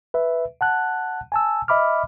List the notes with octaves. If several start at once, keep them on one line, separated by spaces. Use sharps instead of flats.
B4 E5
F#5 A5 F#6
G#5 A5 E6
D#5 E5 B5 D6 F6